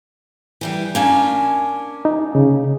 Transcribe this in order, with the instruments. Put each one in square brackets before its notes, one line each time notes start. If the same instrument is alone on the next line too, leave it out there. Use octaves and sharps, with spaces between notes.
[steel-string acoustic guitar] E3 G3 G4
A#3 C#4 D4
[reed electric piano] D#4
C#3